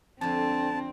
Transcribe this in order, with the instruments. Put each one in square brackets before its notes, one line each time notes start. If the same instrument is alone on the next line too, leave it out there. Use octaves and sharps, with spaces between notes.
[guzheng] F2 D3 [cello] C4 [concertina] A5